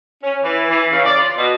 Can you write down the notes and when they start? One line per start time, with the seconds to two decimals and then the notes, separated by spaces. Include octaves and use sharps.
0.23 C#4
0.43 E3
0.69 E3
0.93 C#3
1.05 D5
1.19 F4
1.37 B2